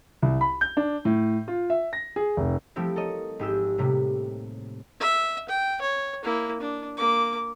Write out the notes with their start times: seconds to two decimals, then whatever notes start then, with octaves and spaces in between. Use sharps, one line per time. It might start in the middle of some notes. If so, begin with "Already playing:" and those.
0.22 C2
0.41 B5
0.61 G6
0.77 D4
1.05 A2
1.48 F4
1.70 E5
1.93 A#6
2.16 G#4
2.37 F1
2.76 F3 G3 A3 C4 E4 G4
2.96 A4 A#4 C#5 D#5
3.39 G#1 D#4 G4 G#4 E6 G6
3.78 A2 C3 G3 A#3
5.00 E5
5.49 G5
5.81 C#5
6.23 A#3 E4
6.61 D4
6.97 A#3 D6